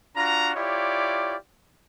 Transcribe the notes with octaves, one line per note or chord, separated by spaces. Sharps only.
D4 F4 F#4 A#5
E4 F4 G4 C#5 D5